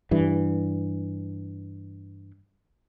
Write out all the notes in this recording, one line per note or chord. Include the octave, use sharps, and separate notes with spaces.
G2 E3